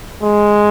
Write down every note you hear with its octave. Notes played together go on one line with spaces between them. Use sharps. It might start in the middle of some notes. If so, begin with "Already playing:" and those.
G#3